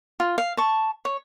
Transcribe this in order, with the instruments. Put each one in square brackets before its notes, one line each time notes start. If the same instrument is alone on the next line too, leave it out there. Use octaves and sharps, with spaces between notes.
[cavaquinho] F4
F5
A5 C#6
C#5